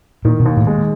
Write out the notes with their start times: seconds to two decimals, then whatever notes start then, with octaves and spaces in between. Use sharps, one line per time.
0.25 A#2 D#3
0.40 B2
0.46 D#2
0.57 A2
0.67 G#3